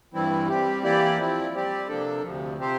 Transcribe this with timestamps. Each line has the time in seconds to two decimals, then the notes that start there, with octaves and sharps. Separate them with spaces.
0.14 G2 E3 G3 C4 E4
0.48 G3 C4 G4
0.83 E3 A#3 E4 G4 D5
1.18 F3 C4 E4
1.53 G3 C4 G4 D5
1.88 C3 F3 A#3 D4 A4
2.23 D2 C3 F3
2.58 C3 F3 C4 G4 C5